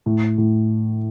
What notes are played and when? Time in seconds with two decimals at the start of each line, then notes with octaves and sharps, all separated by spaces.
0.06 A2
0.38 A2